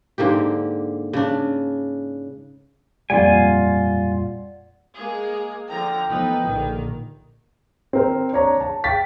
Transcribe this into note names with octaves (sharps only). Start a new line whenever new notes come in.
G#2 D3 A#3 G4
C#3 D4
F2 A#2 G3 F4 D5 F#5 G#5 G#6
G#3 A#3 G#4
D3 F3 G5 A#5
F3 A3 B3 D#4 B4
A#1 D3 D#3
C4 A#4 C5
D4 C#5 A#5
A5
G5 A6 B6